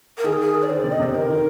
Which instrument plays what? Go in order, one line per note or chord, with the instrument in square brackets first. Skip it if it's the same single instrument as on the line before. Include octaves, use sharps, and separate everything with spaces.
[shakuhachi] A#4
[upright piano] D#3 [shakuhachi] G#4
[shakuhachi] A#4
G#4
A#4
D5
[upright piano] D3 [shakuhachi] C5
[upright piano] C3 [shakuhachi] D5
[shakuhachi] D#5
[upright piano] C3
[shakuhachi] C5
[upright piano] D3 [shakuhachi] A#4
[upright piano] D#3